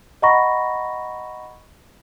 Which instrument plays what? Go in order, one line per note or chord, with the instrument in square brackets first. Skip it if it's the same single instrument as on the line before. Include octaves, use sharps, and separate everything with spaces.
[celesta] D#5 F#5 A#5 B5 C#6 A#6